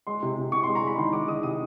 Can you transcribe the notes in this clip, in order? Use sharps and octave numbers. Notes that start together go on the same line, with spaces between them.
G#3 C6
C3
C3
C3 C#6
C6
G#3
A#5
G#3 B5
D#3 C6
G#3 D6
D#3 D#6
C3 D#6